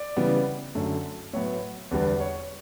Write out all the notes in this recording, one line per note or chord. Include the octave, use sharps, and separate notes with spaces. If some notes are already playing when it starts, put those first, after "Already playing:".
Already playing: D5
C#3 E3 G3 B3
F#2 D3 A3
A2 F#3 B3 C#5
E2 D3 G3 B3 B4
C#5